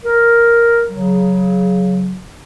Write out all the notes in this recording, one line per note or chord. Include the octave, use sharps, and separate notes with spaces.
A#4
C#3 F#3